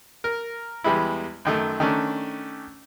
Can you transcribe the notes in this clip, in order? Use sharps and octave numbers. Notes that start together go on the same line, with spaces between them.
A#4
E2 G3 G#3 B3 E4
F#2 D#3 A3
D#3 A3 C#4 D4